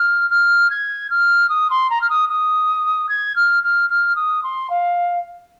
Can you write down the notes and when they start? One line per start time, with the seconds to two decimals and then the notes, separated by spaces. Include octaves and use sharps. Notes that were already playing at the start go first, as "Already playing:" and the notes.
Already playing: F6
0.30 F6
0.70 G#6
1.10 F6
1.49 D#6
1.70 C6
1.90 A#5
2.01 F6
2.10 D#6
2.29 D#6
3.09 G#6
3.36 F6
3.64 F6
3.90 F6
4.16 D#6
4.43 C6
4.70 F5